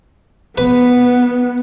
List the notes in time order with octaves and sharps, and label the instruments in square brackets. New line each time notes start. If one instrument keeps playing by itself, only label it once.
[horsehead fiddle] B3 [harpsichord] B4